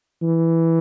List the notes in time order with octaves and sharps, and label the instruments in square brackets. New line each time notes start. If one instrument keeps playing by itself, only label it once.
[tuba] E3